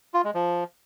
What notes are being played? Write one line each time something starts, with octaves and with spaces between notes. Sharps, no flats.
F4
G#3
F3